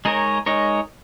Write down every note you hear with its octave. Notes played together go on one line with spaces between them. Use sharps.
G#3 D#4 A#4 C#5
G#3 D#4 A#4 C#5